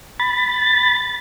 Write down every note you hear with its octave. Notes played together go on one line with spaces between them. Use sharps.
B5 A6